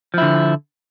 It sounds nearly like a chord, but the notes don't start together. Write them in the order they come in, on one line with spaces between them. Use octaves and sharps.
F3 E4 D3